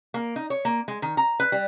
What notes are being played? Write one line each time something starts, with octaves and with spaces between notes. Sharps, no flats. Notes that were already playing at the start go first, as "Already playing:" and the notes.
A#3
D#4
C#5
A#3
G#3
D#3
A#5
B4
G3